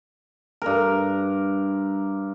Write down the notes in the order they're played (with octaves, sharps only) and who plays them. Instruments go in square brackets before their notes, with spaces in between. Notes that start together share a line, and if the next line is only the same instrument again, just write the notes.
[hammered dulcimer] G2 A#4